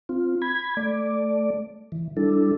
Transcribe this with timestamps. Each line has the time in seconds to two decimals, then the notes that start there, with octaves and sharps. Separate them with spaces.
0.09 C4 F4
0.42 B5 G#6
0.77 A3 D5
1.92 E3
2.17 G3 D4 E4 A4